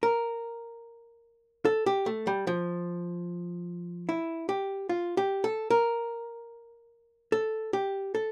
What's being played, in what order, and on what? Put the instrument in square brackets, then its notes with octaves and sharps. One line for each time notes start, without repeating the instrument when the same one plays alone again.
[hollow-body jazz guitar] A#4
A4
G4
A3
G3
F3
E4
G4
F4
G4
A4
A#4
A4
G4
A4